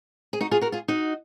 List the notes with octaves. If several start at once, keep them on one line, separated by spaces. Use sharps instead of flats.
G#4
D#4 F#4
F4 G#4
F#4 A#4
F4 G#4
D#4 F#4